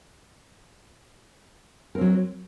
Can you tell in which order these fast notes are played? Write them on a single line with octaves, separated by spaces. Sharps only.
A#4 C4 F#3